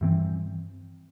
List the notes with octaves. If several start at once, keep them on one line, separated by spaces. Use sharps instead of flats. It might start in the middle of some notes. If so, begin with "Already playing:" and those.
G2 E3 C4